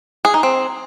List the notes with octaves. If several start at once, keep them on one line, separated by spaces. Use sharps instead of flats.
G#4
D#4
C4